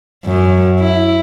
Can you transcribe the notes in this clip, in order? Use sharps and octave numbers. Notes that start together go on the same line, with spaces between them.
F#2
E4